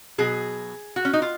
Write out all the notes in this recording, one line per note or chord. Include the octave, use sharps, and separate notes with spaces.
B2 F#3 G#4
F#4
C#4
D#4
F4